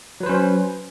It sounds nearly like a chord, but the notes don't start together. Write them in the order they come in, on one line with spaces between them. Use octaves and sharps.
F#3 B4 C5 C#4